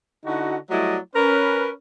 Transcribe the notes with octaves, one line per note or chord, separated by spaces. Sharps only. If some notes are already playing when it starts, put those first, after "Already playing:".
D3 D#4 E4 F#4
F#3 G3 A3 E4 D5 D#5
C#4 A#4 B4